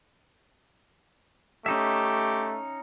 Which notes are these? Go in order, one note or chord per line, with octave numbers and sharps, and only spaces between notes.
A3 C#4 D#4 G4 E5